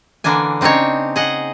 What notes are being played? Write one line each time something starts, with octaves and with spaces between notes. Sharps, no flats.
D3 E3 A#3 D4 G#5
C#3 C4 D4 D#4 C#5
G#4 D#5 F#5